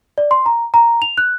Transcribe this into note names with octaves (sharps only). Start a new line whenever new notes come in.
D5
C6
A#5
A#5
F7
F#6